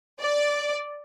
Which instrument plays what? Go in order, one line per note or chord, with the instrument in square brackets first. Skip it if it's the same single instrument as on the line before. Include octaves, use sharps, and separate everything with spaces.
[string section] D5